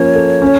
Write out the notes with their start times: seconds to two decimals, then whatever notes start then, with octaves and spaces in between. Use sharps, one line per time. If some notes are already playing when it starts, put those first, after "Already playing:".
Already playing: F3 A#3 C#4 F4 C#5
0.15 A4
0.42 C#4